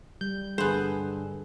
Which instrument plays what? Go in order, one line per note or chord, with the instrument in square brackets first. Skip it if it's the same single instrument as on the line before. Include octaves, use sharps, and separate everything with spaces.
[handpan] G3 [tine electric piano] G6
[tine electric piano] G2 D3 [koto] B3 C5 [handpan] G#4 A4